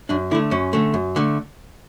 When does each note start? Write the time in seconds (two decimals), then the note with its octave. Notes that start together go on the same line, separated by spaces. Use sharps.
0.09 F#2 D4
0.31 D3 E4
0.35 A3
0.51 F#2 C#4
0.73 D3 A3
0.94 F#2
1.16 D3 A3